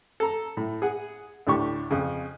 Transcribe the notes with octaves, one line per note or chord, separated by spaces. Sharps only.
A4 A#5
A2
G#4 F#5
D2 A2 D4 G4 C#6
F2 C#3